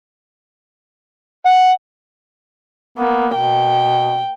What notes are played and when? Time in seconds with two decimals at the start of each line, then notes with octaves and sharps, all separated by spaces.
1.46 F#5
2.98 A#3 B3
3.35 B2 G5